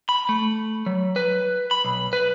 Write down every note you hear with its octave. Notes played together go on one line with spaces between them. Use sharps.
B5
A3
F#3
B4
B5
B1
B4